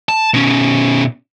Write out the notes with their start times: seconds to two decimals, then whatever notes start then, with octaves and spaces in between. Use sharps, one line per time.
0.09 A5
0.34 B2 C#4